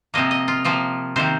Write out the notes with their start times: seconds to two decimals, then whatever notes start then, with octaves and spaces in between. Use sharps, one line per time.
0.14 C3 F3 A#3 D#5
0.31 D#5
0.48 F4
0.64 C3 F3 A#3 F4
1.16 C3 D#3 A#3 C5